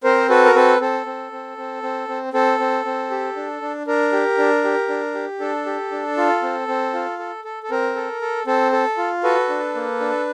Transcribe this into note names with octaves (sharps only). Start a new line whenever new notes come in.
C4 A#4 C5
F#4 A4 B4
A#4
C4 A4 B4
C4 A4
C4
C4
C4
C4
C4
C4 A4
C4
C4
G4
D4
D4
D4 A#4
G4
D4
G4
D4
G4
D4 A4
G4
D4
F4
C4
C4
F4
A4
A4
A4
C4 A#4
A4
A4
C4 A4
A4
F4
F#4 A4 B4
D4
A#3
D4